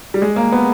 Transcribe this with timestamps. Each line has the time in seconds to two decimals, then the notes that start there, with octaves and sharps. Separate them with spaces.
0.14 G3
0.22 G#3
0.36 A#3
0.52 B3